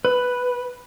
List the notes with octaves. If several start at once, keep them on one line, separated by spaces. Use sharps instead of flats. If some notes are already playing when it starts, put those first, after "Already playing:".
B4